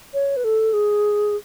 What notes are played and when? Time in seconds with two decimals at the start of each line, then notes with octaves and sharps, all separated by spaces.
0.14 C#5
0.37 B4
0.44 A4
0.73 G#4